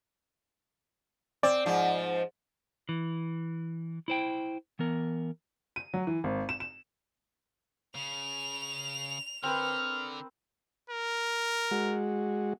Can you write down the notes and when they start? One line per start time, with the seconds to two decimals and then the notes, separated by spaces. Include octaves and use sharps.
1.43 C4 D5
1.66 G#2 F3
2.89 E3
4.08 E4 C5 G5
4.79 E3 B3 A#4
5.76 D#7
5.94 F#3
6.07 E3
6.24 G#1
6.49 E7
6.60 E7
7.95 C#3 F7
9.43 D3 C4 A#4 B4 F6
10.90 A#4
11.71 G#3 F#4